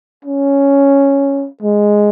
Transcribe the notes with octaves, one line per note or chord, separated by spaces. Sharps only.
C#4
G#3